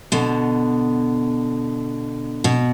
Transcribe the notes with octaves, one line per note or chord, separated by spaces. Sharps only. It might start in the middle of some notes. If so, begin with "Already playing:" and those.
B2 D3
B2